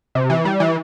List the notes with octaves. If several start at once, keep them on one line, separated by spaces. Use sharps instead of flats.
C3
E3
G3
E3